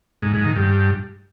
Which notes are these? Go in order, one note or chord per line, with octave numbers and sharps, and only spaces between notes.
G#2
G#2
D#3
G2